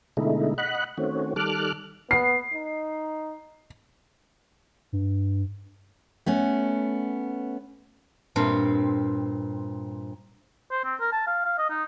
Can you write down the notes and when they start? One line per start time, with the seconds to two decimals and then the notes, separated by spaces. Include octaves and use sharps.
0.17 B2 D3 G#3 A3 D#4 E4
0.58 D#5 F#5 B5 F#6
0.98 D#3 A3 C4 C#4 F#4
1.36 D#3 G3 A4 D6 F6 F#6
2.11 B3 C7
2.54 D#4
4.92 G2
6.26 A3 B3 C#4
8.36 G2 A#2 C4
10.71 C5
10.84 C4
11.01 A#4
11.12 A5
11.27 F5
11.45 F5
11.59 D#5
11.70 D#4